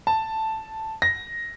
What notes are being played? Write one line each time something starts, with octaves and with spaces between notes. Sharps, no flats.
A5
A#6